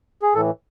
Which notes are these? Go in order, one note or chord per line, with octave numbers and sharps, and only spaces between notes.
G#4
A2 E3 A4